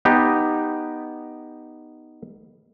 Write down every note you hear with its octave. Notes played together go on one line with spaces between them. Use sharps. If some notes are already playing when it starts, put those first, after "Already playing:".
B3 D#4 G4